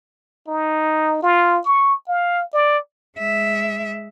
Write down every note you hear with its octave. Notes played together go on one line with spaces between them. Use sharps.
D#4
F4
C#6
F5
D5
G#3 E5